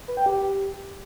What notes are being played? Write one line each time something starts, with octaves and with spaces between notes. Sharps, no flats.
B4
G5
G4